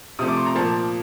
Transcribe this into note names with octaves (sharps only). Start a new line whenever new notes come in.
C3 F3 A3 D#6
D6
C6
A#5
A#2 F3 A#3 A5